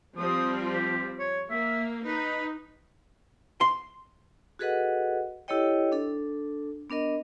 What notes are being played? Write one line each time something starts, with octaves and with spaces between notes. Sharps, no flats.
F3 G3 C4 D#6
G4
C#5
A#3 E5
D#4 B4
C6
F#4 G#4 A4 B4 D#5 F#5
E4 G4 A4 C#5 D#5 G5
D4 A4
B3 D4 A#4 D#5